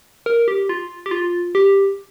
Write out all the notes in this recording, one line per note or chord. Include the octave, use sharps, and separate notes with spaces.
A#4
G4
F4
G4
F4
G4